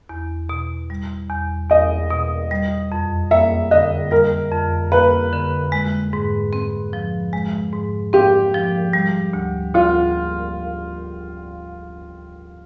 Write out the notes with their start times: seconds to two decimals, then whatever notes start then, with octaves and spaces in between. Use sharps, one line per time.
0.09 E2
0.49 B2
0.90 G3
1.30 E2
1.70 E2 D#5
2.10 B2
2.51 G3
2.92 F2
3.31 A#3 E5
3.71 D3 D#5
4.11 G3 A#4
4.52 F2
4.92 A#3 B4
5.32 D3
5.72 G#3
6.13 G#2
6.53 C4
6.93 F3
7.33 G#3
7.73 G#2
8.13 C4 G4
8.54 F3
8.93 G3
9.33 D2
9.74 D2 F4